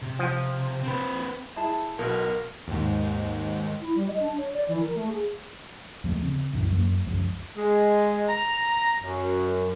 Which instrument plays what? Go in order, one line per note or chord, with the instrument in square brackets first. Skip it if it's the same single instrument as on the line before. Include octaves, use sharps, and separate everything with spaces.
[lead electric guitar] C3
[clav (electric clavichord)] F3
[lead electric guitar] C4 B4
[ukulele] E4 G#4 A5
[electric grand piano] B1 B2 [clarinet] A#4
[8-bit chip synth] D#2 G#2
[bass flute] E4
G3
D#5
D4
C#5
D5
E3
A#4
A3
G#4
[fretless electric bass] D#2 F3 G3 A3
C#3 C4
C2 F#2 A2 E3
F#2 F#3 G3 A#3
C#2 F#2 F3
[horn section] G#3
A#5
F#2